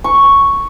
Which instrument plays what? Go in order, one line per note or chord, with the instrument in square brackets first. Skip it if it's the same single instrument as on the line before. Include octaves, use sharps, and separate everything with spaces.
[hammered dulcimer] C#6